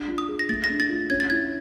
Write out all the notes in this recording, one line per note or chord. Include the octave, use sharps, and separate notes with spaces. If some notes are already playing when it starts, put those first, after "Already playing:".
Already playing: D4
F4
D#6
G#4
A#6
A3 A6
A#6
D4
A6
F4
C#4 G#6
A6
E4 G#6